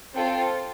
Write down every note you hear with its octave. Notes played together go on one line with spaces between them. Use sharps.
C4 F4 A4 G5